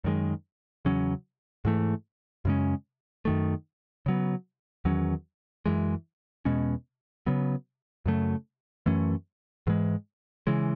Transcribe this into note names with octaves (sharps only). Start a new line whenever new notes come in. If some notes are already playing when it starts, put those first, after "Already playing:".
F#2 D#3 G#3
E2 C#3 F#3 C#4
G#2 E3 A3
F#2 C#3 G#3 C#4
F#2 D#3 A3
C#3 F#3 B3
E2 D#3 F#3 C#4
F#2 E3 G#3
E2 B2 G#3 C#4
C#3 F#3 B3
F#2 C#3 F#3 A3
F#2 E3 A3 C#4
G#2 E3 G#3
C#3 E3 G#3